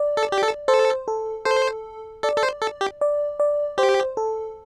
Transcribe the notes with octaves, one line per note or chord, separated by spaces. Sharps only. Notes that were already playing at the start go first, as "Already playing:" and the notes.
Already playing: D5
A4
G4
A4
A4 C5
A4
A4 C5
A4 D5
A4
C5
A4
G4
D5
D5
G4 C5
A4